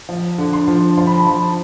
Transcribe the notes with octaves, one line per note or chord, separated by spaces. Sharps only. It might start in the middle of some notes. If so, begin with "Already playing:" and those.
F3
D3
C6
F3
F3 C6
B5
A5
F3 B5